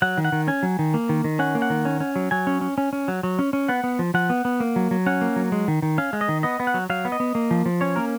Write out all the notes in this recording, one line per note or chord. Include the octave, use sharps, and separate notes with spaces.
F#3 F#5
D#3
F#5
D#3
C#4 G#5
F#3
D#3
A#3
D#3
D#3
C#4 F#5
A#3
F#5
D#3
C#4
C#4
F#3
F#3 G#5
C#4
C#4
C#4
C#4
F#3
F#3
C#4
C#4
B3 F#5
B3
F3
F3 F#5
B3
B3
A#3
F#3
F#3
C#4 F#5
A#3
F#3
G#3
D#3
D#3
C#4 F5
G#3
D#5
D#3
B3 D#5
B3
F#5
F#3
F#3 F5
B3
D#5
B3
A#3
F3
F3
C#4 C#5
A#3 A#4